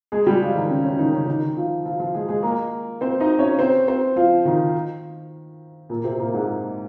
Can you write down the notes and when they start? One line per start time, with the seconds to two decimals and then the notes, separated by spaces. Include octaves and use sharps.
0.12 G#3 G#4
0.27 G3 G4
0.41 F3 F4
0.55 D#3 D#4
0.70 C#3 C#4
0.84 C#3 C#4
0.99 D#3 D#4
1.13 C#3 C#4
1.27 D#3 D#4
1.57 F3 F4
1.85 F3 F4
2.00 F3 F4
2.15 G#3 G#4
2.29 G#3 G#4
2.43 A#3 A#4
3.01 C4 C5
3.20 D#4 D#5
3.39 C#4 C#5
3.59 C4 C5
3.88 C4 C5
4.16 F3 F4
4.45 D#3 D#4
5.89 A#2 A#3
6.04 C3 C4
6.18 A#2 A#3
6.33 G#2 G#3